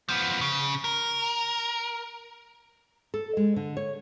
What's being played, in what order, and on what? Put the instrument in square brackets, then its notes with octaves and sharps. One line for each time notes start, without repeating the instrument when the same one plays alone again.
[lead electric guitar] F3 B3
C#3
A#4
[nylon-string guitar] A4
G#3
D3
C#5